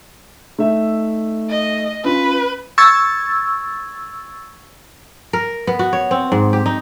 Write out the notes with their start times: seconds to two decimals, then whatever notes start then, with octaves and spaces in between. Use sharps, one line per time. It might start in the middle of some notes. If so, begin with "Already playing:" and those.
0.59 A3 D#4 E5
1.50 D#5
2.04 C#4 F4 B4
2.78 C#6 E6 G#6 A6
5.33 A#4
5.67 B3
5.79 F#4
5.93 C#5
6.11 C4
6.32 G#2
6.53 G4
6.66 D#4